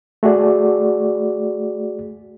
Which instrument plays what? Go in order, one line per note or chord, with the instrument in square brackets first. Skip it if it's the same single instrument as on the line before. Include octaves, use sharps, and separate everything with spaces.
[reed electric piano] A3 F#4 G#4 D5